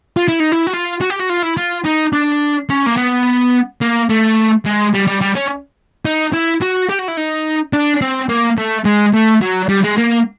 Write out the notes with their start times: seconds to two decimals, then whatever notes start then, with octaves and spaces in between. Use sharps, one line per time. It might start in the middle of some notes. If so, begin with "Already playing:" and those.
0.17 F4
0.28 E4
0.40 D#4
0.52 E4
0.67 F#4
0.73 F4
1.01 F#4
1.10 G4
1.20 F#4
1.29 F4
1.43 E4
1.57 F4
1.85 D#4
2.13 D4
2.70 C#4
2.86 A#3
2.97 B3
3.81 A#3
4.09 A3
4.65 G#3
4.94 G3
5.07 G3
5.21 G3
5.35 C#4
6.05 D#4
6.33 E4
6.61 F#4
6.89 G4
6.99 F#4
7.08 E4
7.17 D#4
7.73 D4
8.02 C4
8.29 A#3
8.58 A3
8.85 G#3
9.14 A3
9.42 F#3
9.69 G3
9.84 G#3
9.97 A#3